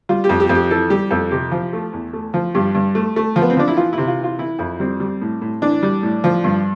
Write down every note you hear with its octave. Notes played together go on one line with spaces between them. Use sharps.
G3 F4
G4
F2
G4
F2
G4
E3 A4
G3 G4
F2 A4
C3 G4
F3
A3
E2
A3
F3
G2 G4
G2
A3
A3
F3
B3
C4
F3 D4
E4
E3 F4
C3 E4
F4
E3 F4
E3 E4
F2 E4
G3 C4
G3
A2
A2
E3 D4
G3
A2
F3
G2